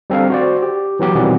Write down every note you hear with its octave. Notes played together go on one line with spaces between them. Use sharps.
G3 C4 D4 A4 F5
F#4 C5 D5
G4
E3 F#3 B3 G4
B2 D#3 E3 G3 B3 C4